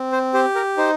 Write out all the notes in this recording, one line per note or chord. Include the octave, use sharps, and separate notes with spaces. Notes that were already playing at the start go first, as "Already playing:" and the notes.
Already playing: C4
C5
G4 C5
A#4
D#4 C5